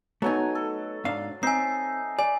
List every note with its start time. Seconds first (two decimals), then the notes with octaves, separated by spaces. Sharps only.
0.22 F#3 A3 B3 D#4 G#5
0.55 A4
1.05 G#2 D4 F5
1.43 C4 D#4 E5 G#5 C7
2.19 D5 G#5